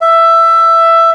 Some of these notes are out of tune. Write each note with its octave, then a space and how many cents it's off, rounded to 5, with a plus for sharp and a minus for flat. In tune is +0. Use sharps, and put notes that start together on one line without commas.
E5 +10